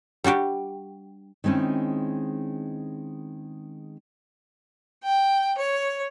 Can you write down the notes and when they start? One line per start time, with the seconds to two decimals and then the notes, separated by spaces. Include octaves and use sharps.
0.24 G3 D4 F#4 G4
1.44 D#3 G#3 C4 C#4 E4
5.03 G5
5.58 C#5